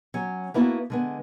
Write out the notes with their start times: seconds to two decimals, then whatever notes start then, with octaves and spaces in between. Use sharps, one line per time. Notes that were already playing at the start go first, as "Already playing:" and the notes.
0.14 F#3 C#4
0.54 A#3 B3 E4 F#4 G4 A4
0.90 D3 G#3 B3